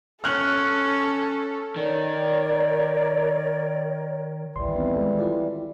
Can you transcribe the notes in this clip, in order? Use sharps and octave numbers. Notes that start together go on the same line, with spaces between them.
C#4 A4 F6 F#6
D#3 A#4 C#5 D5
A1 D2 E3 G3 C6
B3 C4 D#4
D#3 G#3 A4
E4 F4 D5